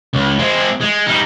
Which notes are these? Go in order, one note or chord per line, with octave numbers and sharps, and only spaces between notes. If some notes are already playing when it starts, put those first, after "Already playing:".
C#2
G#3 C4
G#3
G3 D#4